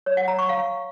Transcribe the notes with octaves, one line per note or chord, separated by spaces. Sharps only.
C#5
F#5
A#5
C#6
F5